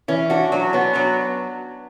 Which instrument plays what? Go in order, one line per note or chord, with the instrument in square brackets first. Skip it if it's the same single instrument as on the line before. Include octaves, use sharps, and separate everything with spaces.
[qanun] E3 [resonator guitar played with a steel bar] C#4
[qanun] D4 [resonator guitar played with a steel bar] F#4
[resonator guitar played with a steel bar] F#3 [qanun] D4
[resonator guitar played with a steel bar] B3 [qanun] C#4
[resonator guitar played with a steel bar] F#3 [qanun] D4